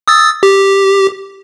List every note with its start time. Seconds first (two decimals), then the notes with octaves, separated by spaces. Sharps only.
0.08 D#6 E6 A6
0.43 G4